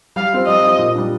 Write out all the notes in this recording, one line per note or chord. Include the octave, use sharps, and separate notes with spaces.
G3 F5
C4 F4
G3 D#5
C4 F4
A#2
G3 D4